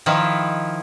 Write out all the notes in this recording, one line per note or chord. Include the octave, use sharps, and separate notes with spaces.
D#3 F3 E4